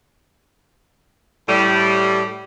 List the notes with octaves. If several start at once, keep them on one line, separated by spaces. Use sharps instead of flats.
A2 G3